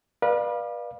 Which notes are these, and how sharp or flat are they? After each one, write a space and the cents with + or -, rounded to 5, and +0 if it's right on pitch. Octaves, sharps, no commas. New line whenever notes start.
B4 -30 D5 +30 F5 +0